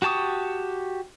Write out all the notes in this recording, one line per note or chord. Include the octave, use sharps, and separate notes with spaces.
F#4 G4 A5 C#6 D#6